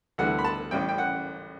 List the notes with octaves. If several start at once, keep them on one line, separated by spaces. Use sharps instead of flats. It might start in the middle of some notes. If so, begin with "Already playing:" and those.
D2 D3 G3 B3 E4 F#5
B5
A5
A1 A2 G3 C#4 G5
G5
F#5